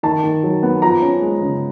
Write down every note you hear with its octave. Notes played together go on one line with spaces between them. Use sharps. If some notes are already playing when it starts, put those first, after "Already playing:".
D#3 A5
D#3
F#3
B3
F3 A#5
C#4
G#3
C#3